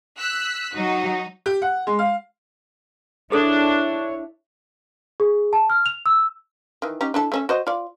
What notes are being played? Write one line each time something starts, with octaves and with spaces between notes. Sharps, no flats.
E6 F#6 B6
F#3 D#4 F#4
G4
F#5
G#3
F5
D4 E4 G#4 A4 C#5
G#4
A5
F6
F7
E6
D#3 E3
C#4 D#4 G4
D4 E4 A4
A3 C#4 E5
F#4 C5 D#5
F4 D5